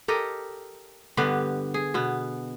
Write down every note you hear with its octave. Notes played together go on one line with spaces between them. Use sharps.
G4 A4 A#4 D#5
G2 D3 B3 G4
G#4
B2 B3